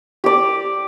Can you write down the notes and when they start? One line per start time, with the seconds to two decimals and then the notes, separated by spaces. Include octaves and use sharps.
0.24 G4 D5